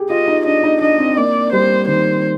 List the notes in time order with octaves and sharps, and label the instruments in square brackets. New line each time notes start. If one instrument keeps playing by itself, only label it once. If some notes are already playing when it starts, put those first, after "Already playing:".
Already playing: [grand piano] G4 G#4
[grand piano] F4 [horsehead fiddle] D#5
[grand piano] D#4
[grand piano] D4 [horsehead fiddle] D#5
[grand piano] D#4
[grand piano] D4 [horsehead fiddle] D#5
[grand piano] C4
[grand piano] A#3 [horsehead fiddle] D5
[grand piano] G3 [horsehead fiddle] C5
[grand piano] D#3 [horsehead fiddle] C5